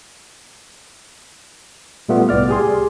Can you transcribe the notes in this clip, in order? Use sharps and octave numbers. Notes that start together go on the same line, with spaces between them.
A#2 G3 A3 B3 F4
C2 A2 D5 F6
G4 G#4 C6